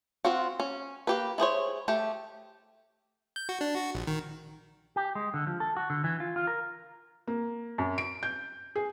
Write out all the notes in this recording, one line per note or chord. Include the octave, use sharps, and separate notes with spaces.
C4 F4 F#4
C#4
A#3 G4 B4
E4 G#4 C5 C#5
A3 G4
G6
F#4
D4
F#4
A#1
D#3
G4
G#3
D3
F3
A4
F#4
D3
E3
F4
F4
A#4
A#3
F#2
D7
G6
G#4